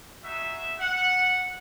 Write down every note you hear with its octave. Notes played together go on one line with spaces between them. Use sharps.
G#3 D#4 F#4 E5
F#5